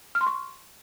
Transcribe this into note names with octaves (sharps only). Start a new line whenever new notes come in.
F6
C6
C#6